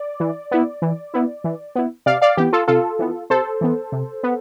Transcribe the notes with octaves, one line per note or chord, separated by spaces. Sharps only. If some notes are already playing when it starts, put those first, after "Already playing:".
Already playing: D5
E3
B3 E4
E3
B3 E4
E3
B3 E4
C3 D5 F5
D5 F5
E3 B3 G4
F4 A4
C3 F4 A4
E3 B3
C3 A4 C5
E3 B3
C3
B3